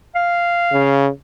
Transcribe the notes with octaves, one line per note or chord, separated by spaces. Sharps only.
F5
C#3